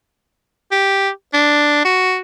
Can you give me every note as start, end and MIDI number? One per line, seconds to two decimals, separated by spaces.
0.72 1.10 67
1.34 1.82 62
1.85 2.20 66